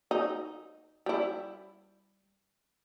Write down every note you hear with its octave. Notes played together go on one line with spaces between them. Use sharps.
D#4
G3 E4